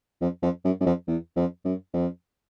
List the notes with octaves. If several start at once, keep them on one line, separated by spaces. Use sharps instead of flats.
F2
F2
F#2
F#2
F2
E2
F2
F#2
F2